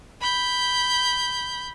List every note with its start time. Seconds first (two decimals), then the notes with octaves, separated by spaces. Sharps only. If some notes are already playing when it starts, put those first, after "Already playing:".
0.21 B5 G6